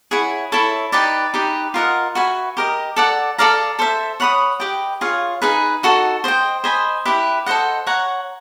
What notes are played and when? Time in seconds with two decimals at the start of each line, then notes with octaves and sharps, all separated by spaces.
0.11 E4 G#4 C#5 F#5
0.52 E4 A4 C#5
0.92 D#4 G4 B4 D5
1.34 D#4 G4 B4
1.74 F4 A#4 D#5 F#5
2.15 F#4 B4 E5 G#5
2.57 G4 A#4 D#5
2.96 A4 D5 F#5
3.38 A4 D5 F5 A#5
3.79 A4 C5 E5
4.20 C#5 F#5 B5 D#6
4.60 G4 B4 D#5 G5
5.01 F4 G#4 C#5 F5
5.42 D#4 G#4 B4
5.83 D#4 F#4 A4
6.24 C5 D#5 G5
6.64 C5 D#5 G#5 B5
7.05 E4 G4 B4 E5
7.46 A4 C5 D#5 F#5
7.86 C#5 F#5 A#5